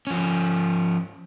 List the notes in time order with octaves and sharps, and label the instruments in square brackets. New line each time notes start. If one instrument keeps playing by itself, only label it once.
[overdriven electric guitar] F3 C#4